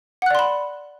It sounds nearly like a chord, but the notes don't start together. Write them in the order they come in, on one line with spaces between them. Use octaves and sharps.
F#5 F#6 D5 C6 B5